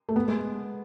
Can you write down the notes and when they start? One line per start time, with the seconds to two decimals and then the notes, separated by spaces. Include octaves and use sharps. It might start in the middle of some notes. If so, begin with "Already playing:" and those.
0.09 A3
0.16 B3
0.28 G#3